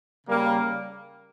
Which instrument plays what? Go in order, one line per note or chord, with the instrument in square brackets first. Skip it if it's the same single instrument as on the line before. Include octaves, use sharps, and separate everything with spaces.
[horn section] C#3 G3 A#3